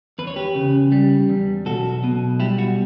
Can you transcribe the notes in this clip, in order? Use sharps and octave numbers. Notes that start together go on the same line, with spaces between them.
E2 B4
C#5
G4 B4
C#3
G3
E2
B1 F#4 A4
B2
G3 E4 G4
F#4